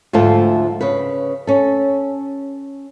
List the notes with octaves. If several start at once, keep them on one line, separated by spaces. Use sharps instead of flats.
D2 G#2 F3 A3 F4 A4
C#3 B4
C#4 A4